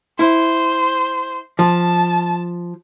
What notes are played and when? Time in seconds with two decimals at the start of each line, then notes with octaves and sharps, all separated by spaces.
0.19 E4 C5
1.59 F3 A5